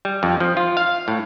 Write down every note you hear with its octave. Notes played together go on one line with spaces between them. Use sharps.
G3
F2
F3
F4
F5
A2